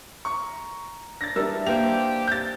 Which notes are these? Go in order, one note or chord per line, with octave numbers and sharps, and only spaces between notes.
A#5 C#6
D4 A6 A#6
E3 G3 D4 D#4 A#4 E6
A#3 G4 C5 D5 F7
G6 A6